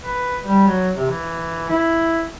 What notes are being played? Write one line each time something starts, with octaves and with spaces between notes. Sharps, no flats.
B4
G3
F#3
C3
E3
E4